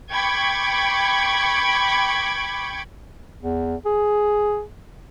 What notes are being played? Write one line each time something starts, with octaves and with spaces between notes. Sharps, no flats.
G5 B5 C#6 D6 G#6
E2
G#4